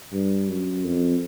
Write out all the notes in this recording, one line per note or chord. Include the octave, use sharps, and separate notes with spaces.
G2
F#2
F2